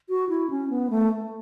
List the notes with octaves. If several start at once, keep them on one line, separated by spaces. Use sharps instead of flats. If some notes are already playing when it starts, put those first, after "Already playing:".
F#4
E4
C#4
B3
A3